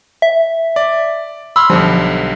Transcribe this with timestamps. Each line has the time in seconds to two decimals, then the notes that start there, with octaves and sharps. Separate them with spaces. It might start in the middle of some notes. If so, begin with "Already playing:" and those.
0.22 E5
0.76 D5
1.56 B5 C6 E6 F6
1.70 B1 D3 F3 G3